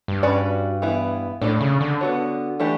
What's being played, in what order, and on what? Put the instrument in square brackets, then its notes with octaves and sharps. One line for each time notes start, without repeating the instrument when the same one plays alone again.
[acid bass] G2
[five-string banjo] C#4 F#4 B4 D5
E3 B3 E4
[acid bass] A2 [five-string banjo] D4 A4 D5
[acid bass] C#3
D3
[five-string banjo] B3 F#4 C#5
E3 A3 D4 G4